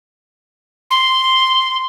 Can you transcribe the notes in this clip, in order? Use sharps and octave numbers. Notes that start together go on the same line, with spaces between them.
C6